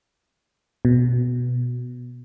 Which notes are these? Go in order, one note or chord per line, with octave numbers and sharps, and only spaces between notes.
B2